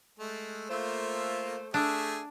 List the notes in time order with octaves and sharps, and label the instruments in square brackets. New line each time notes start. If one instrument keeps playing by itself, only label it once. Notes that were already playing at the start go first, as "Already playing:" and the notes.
[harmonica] G#3 A3
[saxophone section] A3 C5 [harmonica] A#3 F4 E5
[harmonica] A3 G#4 E5 [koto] D4